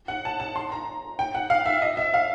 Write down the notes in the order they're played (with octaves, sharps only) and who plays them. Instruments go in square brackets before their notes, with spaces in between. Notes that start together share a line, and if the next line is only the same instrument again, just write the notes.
[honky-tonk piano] F#5
A5
A5
C6
A#5
G5
F#5
F5
E5
D#5
E5
F5